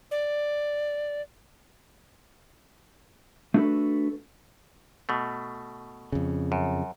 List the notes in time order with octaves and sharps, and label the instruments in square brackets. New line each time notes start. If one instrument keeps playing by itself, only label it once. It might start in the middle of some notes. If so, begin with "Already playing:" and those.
[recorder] D5
[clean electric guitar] A3 D4 F#4 G#4 A4 B4
[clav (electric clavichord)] B2 A3
[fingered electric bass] F2 C#3
[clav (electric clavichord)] F#2